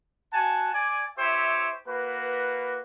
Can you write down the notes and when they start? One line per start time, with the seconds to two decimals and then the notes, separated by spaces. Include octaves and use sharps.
0.33 F#4 F#5 G#5 A5
0.73 D5 G#5
1.18 E4 G4 C5 C#5 E5
1.87 A#3 F#4 B4